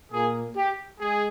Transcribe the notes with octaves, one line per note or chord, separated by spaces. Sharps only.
A#2 A#3 G#4
G4
G#3 G#4